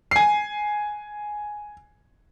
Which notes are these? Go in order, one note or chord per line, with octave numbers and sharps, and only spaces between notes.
G#5 C7